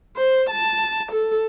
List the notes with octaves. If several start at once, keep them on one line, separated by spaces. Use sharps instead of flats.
C5
A5
A4